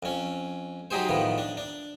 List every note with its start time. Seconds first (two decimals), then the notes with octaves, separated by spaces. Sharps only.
0.03 F2 C#4
0.91 F#3 D#4 G4 G#4 C5
1.09 A2 D#3 F3 B3
1.38 D4
1.57 D4